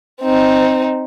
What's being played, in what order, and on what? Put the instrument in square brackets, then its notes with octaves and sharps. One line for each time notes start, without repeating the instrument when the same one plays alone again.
[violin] C4 D#4